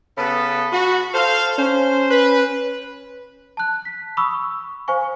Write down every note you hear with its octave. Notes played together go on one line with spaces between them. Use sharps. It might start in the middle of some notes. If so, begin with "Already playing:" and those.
C#3 B3 A4 B5
F#4
A4 C5 F5
C#4 C5
B4
A5 F#6
B6
B5 C#6 D#6 E6
C5 F5 G#5 C#6